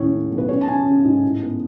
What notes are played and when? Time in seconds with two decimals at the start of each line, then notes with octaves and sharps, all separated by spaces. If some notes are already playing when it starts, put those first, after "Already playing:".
Already playing: D#2 A2 C#4 C#5
0.12 C#4
0.31 B1
0.38 B4
0.49 C#4 C#5
0.61 A5
0.67 C#4 G#5
0.73 A5
0.85 C#4
1.04 G#2
1.23 A2
1.42 B3